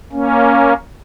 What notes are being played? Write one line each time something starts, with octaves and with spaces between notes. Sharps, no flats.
A#3 C#4